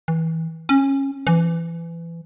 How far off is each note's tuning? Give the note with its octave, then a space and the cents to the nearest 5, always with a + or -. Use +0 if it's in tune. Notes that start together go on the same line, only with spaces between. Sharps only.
E3 -25
C#4 -20
E3 +25